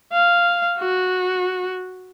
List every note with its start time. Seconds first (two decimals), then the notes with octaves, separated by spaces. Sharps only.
0.13 F5
0.79 F#4